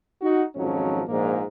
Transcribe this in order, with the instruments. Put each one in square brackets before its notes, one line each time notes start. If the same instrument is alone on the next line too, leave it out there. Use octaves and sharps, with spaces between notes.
[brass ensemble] D#4 F#4
G#1 F2 F3 F#3 C#4 D#4
A#1 G#2 A#3